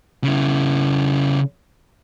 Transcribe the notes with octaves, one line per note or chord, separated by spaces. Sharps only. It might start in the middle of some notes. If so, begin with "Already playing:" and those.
C#3 E4